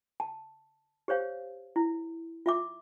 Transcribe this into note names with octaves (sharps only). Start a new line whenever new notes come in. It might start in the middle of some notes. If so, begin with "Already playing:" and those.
A5
G4 C5 C#5 F5
E4
F4 E5 D6